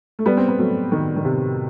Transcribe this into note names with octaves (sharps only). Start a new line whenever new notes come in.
A3
G3 B3
C4
B3
F#3 A3
D#3
D#3
C3